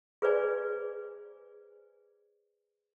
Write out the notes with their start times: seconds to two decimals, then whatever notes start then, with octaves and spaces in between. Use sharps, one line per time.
0.22 G#4 B4 C5 D5 G#5